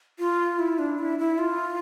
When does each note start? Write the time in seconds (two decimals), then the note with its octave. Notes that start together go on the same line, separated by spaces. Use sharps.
0.19 F4
0.59 E4
0.79 D4
0.99 E4
1.19 E4
1.38 F4